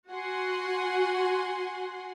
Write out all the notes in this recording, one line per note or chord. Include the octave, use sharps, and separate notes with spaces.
F#4 F#5 G#5 C6